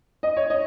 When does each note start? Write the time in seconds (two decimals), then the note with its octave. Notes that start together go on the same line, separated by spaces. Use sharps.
0.23 D#5
0.37 C#5
0.50 D#5